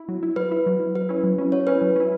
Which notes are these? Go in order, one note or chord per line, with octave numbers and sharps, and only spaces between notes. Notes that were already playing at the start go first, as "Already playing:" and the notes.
Already playing: E4
F#3
E4
F#3 B4
E4
F#3
E4
F#3 B4
C#4 E4
F#3
C#4 E4
F#3 C#5
C#4 E4 B4
F#3
C#4 E4